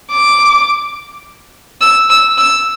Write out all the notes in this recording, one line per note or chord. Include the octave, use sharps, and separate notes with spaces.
D6
E6
E6
E6